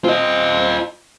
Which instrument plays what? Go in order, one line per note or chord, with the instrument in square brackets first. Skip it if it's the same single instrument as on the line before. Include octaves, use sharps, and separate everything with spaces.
[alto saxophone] C4 [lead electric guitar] F4 D#5